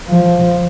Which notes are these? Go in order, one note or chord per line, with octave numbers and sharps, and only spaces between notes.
F3